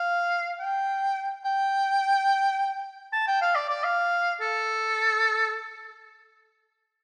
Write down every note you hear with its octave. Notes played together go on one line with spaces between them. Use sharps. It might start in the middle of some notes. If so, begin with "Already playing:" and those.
Already playing: F5
G5
G5
A5
G5
F5
D5
D5
F5
A4